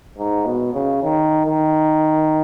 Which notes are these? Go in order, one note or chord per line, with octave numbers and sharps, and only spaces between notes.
G#2
B2
C#3
D#3
D#3